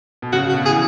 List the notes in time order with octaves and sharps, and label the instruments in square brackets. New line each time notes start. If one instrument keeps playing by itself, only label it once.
[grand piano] B2
[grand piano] C#3 [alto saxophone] F#4
[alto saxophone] F#4
[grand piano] B2
[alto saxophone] G#4
[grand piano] E3